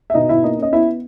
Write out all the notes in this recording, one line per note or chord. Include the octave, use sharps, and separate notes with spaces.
E5
B2 D#4 D#5
B2 E4 E5
A#3 D#4 D#5
C#4 D#5
B3 E4 E5